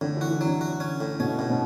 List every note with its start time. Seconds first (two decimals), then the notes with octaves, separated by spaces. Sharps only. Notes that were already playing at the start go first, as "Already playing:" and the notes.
0.01 A2 D3
0.17 E3 F#4
0.31 E3
0.41 D3 F#3
0.61 F#4
0.80 C#4
1.01 A2
1.20 B2 C#4
1.39 A2
1.50 B2